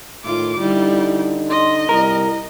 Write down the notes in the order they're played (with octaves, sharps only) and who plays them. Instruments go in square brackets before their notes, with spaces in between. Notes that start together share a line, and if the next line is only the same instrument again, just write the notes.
[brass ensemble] A2 D#3 [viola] F4 D6
[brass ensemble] D3 D#4 [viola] G3 [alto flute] E4
[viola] D#5 [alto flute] C6
[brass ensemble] C2 G3 [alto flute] E4 [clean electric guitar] A#4